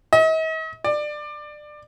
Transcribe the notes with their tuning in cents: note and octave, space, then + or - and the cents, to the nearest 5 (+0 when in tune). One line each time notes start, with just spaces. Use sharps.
D#5 +45
D5 +25